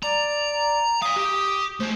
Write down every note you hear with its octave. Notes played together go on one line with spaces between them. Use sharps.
D5 A#5
D5 F5 D#6
G4
A3 G#4 C5